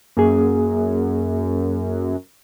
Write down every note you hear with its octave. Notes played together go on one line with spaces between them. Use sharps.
F#2 A#3 G#4